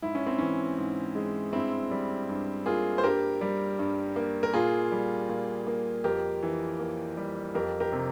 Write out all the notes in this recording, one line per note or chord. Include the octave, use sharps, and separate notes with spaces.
G#2 E4
C#4
C4
E3 C#4
G#2
G#3
G2 C4 E4
G3
G2
A#3 F4 G#4
C5
G2 G4 A#4
G3
G2
A#3
A#4
A#2 F4 G#4
G3
A#2
A#3
F2 G4 A#4
E3
A#3
G3
F2 G4 A#4
G4 A#4
C3